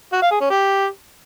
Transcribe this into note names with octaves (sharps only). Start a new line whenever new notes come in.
F#4
F5
G#4
C#4
G4